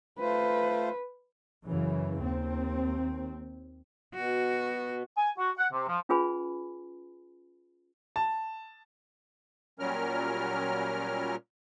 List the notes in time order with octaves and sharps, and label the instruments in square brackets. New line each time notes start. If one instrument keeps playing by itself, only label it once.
[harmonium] A3 F4 C5 [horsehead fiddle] B4
[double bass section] F#2 C#3 E3
D#2 C4
[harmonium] B2 [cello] F#4
[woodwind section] G#5
F#4
F#5
C3
F3
[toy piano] C#4 F4 G#4 B4 G#5 B5
[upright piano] A5
[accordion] A#2 F#3 G3 C#4 A#4 F6